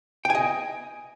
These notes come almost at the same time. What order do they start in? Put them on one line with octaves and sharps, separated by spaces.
G5 G#5 D#5